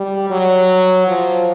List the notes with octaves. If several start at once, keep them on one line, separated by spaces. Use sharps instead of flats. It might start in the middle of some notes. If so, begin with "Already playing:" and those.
Already playing: G3
F#3
F3